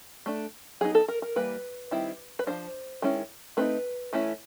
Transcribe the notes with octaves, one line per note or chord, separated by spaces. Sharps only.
A3 D4
F#3 B3 D#4 G#4
A4
A#4
A#4
E3 G3 A#3 B4
D#3 G3 C4 E4
B4
F3 A#3 D4 C5
D#3 G#3 C#4 E4
A3 C4 D#4 B4
E3 A3 C#4 E4